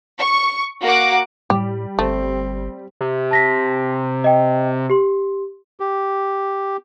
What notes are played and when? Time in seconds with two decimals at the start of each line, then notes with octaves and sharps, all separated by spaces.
0.20 C#6
0.83 A#3 F#4 F#5 D6
1.50 A2 G3 G4
1.99 G1 A3 C4
3.01 C3
3.31 A5 A#6 B6
4.24 D#5 G5
4.90 G4 C6
5.80 G4